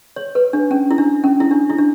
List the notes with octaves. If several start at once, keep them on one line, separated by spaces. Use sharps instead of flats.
C#5
B4
D4
C#4
E4
D4
C#4
E4
D4
E4
D4